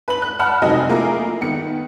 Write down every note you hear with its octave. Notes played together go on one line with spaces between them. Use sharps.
B4 B5 F#7
F#6
F#5 A5 B5 F6
F1 F#3 C4 D#4 D#5 G#5
A3 A#3 E4 F4 G#4 A#4
D#3 B3 C#7